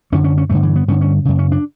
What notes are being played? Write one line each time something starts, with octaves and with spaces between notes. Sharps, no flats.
F#2 D3 C#4
C#4
C#4
G2 D3 A3
E3
B3
G2 D3 C#4
C#4
F#2 C#3
C#4
D4